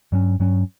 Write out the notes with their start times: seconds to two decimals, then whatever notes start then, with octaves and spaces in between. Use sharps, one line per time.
0.12 G2 F#3 C#4
0.40 G2 F#3 C#4